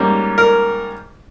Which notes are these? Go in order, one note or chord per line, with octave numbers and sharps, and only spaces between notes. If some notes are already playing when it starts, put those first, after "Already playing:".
Already playing: G#2 G3 A#3 C#4
A#4